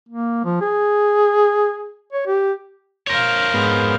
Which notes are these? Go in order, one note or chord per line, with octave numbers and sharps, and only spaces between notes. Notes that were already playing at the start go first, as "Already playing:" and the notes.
A#3
F3
G#4
C#5
G4
A#4 C5 C#5 F5
G#2 B3